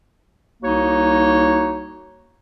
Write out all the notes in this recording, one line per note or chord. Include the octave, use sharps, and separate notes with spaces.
C2 A#3 D#4 F#4 C#5